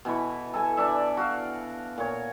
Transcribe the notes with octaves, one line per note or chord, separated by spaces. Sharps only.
B2 E3 B4 C#6
A4 G#5 A5
E3 D4 D5 E5
F#4 F5
A#2 C#5